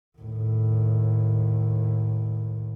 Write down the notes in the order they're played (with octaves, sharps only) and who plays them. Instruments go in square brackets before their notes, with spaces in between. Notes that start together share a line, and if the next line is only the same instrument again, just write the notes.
[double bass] D#2 A2